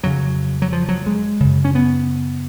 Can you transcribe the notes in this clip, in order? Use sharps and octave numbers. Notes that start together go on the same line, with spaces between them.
F2 C#3 F#3
F#3
F3
F#3
G#3
F#2 C#3
C#4
B3